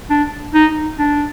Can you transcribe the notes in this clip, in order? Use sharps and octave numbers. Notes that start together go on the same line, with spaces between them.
D4
D#4
D4